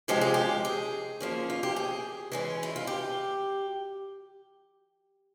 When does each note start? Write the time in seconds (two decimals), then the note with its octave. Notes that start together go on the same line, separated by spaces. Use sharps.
0.08 C3 F3 G#3 C#4 G4
0.21 G#4
0.34 G4
0.65 G#4
1.20 F3 A#3 C#4
1.50 F4
1.63 G4
1.76 G#4
2.32 E3 G#3 C#4
2.63 E4
2.76 F4
2.87 G4